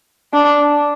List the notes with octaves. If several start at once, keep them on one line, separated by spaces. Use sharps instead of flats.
D4